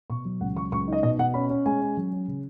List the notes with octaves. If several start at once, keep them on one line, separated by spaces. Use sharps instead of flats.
B2 C#6
F#3
C#2 F#5
F#3 C#6
C#2 C#6
D#4 D#5
B2 D#5
B2 F#5
C#4 B5
C#4
G#3 G#5
C#4
F#3
C#4
C#3